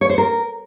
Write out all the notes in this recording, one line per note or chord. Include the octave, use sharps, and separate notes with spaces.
C#5
C5
A#4